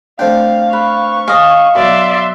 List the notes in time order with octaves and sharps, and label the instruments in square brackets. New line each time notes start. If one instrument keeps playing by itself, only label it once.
[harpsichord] A3 C4 D4 [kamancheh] F5 [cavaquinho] G5
[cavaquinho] B4 [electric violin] C#6
[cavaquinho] D#5 F5 [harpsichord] G#5
[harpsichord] B2 F#3 [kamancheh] D5 [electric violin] E5 C6